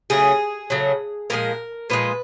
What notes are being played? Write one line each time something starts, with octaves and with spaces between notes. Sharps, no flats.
C#3 F#3 A3 G#4
C#3 F#3 A3
A#2 F3 G#3 A#4
A#2 F3 G#3 B4